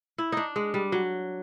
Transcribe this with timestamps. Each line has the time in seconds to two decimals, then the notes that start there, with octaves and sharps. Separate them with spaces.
0.18 E4
0.32 D4 D#4
0.56 G#3
0.74 G3
0.92 F#3